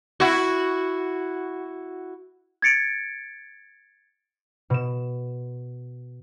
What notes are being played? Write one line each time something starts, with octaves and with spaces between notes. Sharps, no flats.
E4 F#4
G#6 A6 C#7 D7
B2 E7